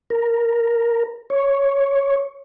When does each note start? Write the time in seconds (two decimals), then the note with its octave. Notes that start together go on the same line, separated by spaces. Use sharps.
0.10 A#4
1.30 C#5